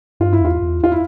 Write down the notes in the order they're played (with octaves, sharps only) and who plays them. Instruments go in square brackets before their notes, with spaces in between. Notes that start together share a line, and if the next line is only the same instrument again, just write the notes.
[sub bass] G2 [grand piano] F4
[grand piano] E4
[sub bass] E2 [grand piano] F4
[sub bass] E2
[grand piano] F4
E4